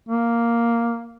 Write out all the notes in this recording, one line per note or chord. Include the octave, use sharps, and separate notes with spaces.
A#3